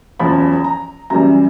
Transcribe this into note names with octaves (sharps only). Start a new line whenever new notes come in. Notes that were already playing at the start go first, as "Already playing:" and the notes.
F#1 E2 C#3 F3 B5
A#5
F#2 C#3 E3 G3 A#5